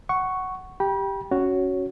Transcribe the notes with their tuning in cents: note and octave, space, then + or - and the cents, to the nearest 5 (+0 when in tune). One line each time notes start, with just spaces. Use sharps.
F#5 +10 C#6 +0
G4 +0 G5 +0 B5 -35
C#4 +0 F#4 +0 C#5 +0